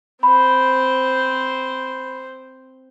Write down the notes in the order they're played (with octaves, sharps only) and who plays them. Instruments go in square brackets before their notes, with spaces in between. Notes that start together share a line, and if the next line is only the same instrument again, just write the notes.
[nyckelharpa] C4 C5 [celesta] B5